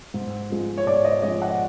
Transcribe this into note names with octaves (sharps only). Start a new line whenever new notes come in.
G#2
F3 G#3
C#5
G#2 D5
D#5
F3 G#3 D#5
F#5